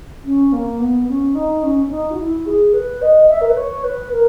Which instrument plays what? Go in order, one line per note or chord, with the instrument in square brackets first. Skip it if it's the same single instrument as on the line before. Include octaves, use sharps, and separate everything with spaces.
[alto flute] C#4
A#3
B3
C#4
D#4
C#4
C#4
D#4
F#4
E4
G#4
B4
D#5
E5
A#4
B4
C#5
B4
A#4